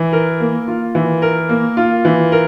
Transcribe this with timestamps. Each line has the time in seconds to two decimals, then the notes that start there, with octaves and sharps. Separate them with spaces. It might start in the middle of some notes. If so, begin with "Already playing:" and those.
Already playing: E3
0.13 A#4
0.40 A#3
0.68 F4
0.95 E3
1.22 A#4
1.49 A#3
1.77 F4
2.05 E3
2.32 A#4